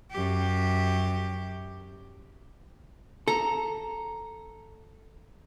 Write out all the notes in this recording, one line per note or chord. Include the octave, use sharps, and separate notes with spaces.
F#2 G4
A4 A#5